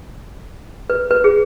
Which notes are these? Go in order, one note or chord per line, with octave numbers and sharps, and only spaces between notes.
B4
B4
G#4